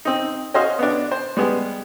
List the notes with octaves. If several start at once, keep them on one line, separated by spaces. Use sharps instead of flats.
C4 D#4
C#4 F#4 C5 D#5 F5 C6
B3 D4
C5
G3 G#3 B3